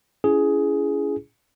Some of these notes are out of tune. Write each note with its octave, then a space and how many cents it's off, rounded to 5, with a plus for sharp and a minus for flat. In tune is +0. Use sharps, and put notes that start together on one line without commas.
C#4 +40 E4 +35 G#4 +10